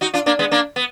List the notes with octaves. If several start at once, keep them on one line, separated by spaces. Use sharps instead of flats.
D#4 F#4
D4 F4
A#3 D4
G#3 B3
A#3 D4
B3